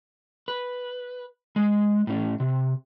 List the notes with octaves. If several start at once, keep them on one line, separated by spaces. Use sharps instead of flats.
B4
G#3
A2 C#4
C3